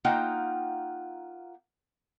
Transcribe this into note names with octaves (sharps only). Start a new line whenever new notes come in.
A#3 D#4 F4 F#5 G5